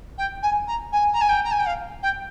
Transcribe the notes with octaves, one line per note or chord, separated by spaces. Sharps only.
G5
G#5
A#5
G#5
A#5
G#5
G5
A#5
G#5
G5
F5
G5